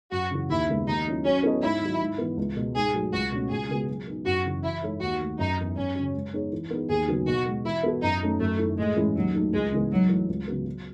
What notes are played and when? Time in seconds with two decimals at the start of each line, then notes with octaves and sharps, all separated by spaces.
0.12 F#2 F#4
0.31 C#3 E3
0.49 D#2 E4
0.68 C#3 G#3 B3 D#4
0.87 D#2 D#4
1.06 D#3 F#3 C#4 E4
1.25 F#3 C#4
1.43 B3 E4 A4 D#5
1.63 G#2 E4
1.81 D#3 F#3
2.00 G#2
2.18 E3 B3
2.37 C#2
2.57 B2 G#3
2.75 G#2 G#4
2.94 F#3 A3 D#4
3.13 C#2 F#4
3.32 B2 A3 C#4
3.50 C#2 G#4
3.69 C#3 G#3 B3 F#4
3.89 F#3
4.07 B3 D#4
4.26 F#2 F#4
4.45 C#3 E3
4.64 E3 E4
4.83 G#3 D#4 A4 C#5
5.01 D#2 F#4
5.20 D#3 A3
5.39 F#2 D#4
5.58 E3 B3
5.77 F#2 C#4
5.95 C#3 F#3
6.14 G#3
6.33 B3 D#4 G#4 C#5
6.52 E3
6.71 B3 D#4 G#4
6.89 D#2 G#4
7.08 C#3 F#3 B3
7.27 B2 F#4
7.46 G#3 B3
7.65 E3 E4
7.83 B3 F#4 A4
8.03 F#2 D#4
8.21 D#3 A3 C#4
8.40 F#2 A3
8.58 D#3 A3 E4
8.78 A2 G#3
8.96 E3 G#3 C#4 E4
9.16 D#2 F#3
9.34 D#3 F#3 A3 D#4
9.53 C#2 G#3
9.72 C#3 E3 G#3 B3
9.91 G#2 F#3
10.09 E3 A3
10.29 C#2
10.47 C#3 F#3 B3
10.66 F#3